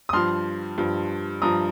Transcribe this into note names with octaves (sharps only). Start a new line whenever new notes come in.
D#6
G2 F3 C6 F6
G2 F3
G2 F3 A#5 D#6